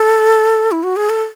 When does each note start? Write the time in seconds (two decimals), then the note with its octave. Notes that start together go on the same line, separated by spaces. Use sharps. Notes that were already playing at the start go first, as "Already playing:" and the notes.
Already playing: A4
0.72 E4
0.83 F#4
0.96 G#4
1.10 A4